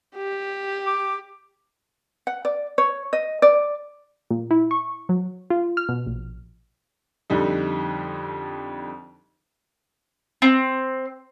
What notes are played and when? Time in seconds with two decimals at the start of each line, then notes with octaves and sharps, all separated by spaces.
0.16 G4
0.87 D6
2.27 F#5
2.45 D5
2.78 C#5
3.13 D#5
3.42 D5
4.31 A#2
4.51 E4
4.71 C#6
5.09 F#3
5.50 F4
5.77 F6
5.89 B2
6.07 A#1
7.30 F2 D3 G3 D#4
10.42 C4